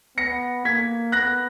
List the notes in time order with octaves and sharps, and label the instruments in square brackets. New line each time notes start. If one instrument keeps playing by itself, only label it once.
[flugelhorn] B3 [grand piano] A#6 C#7
[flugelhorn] A#3 [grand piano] G#6 B6
[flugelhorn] B3 [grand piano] F#6 A#6